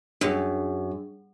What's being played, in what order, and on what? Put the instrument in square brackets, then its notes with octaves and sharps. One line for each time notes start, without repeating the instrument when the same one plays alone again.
[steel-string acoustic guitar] F#2 [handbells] D4 G#4